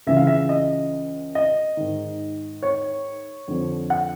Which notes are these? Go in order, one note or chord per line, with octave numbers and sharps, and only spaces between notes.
C#2 C#3 E3 E5
F5
E5
D#5
D#5
G#2 D#3
C#5
F2 D3 F3
F#5